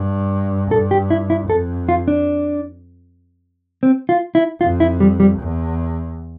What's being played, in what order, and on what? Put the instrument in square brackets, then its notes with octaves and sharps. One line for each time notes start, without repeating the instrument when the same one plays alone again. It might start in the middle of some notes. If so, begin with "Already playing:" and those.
Already playing: [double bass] G2
[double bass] G2 [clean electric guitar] A4
[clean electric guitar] G4
E4
E4
[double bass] F2 [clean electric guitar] A4
[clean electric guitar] F4
D4
C4
F4
E4
[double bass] F2 [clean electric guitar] F4
[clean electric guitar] E4
G3
G3
[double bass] E2